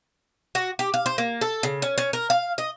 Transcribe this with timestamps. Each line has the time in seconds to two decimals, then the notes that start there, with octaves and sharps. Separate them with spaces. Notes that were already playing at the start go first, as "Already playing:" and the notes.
0.55 F#4
0.79 G4
0.94 F5
1.06 C5
1.18 A#3
1.41 A4
1.63 C#3
1.82 C#4
1.98 C#4
2.13 A#4
2.30 F5
2.58 D#5